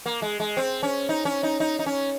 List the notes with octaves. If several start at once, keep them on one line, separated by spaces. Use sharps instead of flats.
A#3
G#3
G#3
C4
C#4
D#4
C#4
D#4
D#4
D#4
C#4